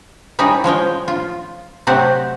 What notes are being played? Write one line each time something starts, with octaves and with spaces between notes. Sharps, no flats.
G3 C#4 D#4 E4 G#4
F3 G#3 C#5 G5
F4
C3 F#3 A3 C4 G4 F#5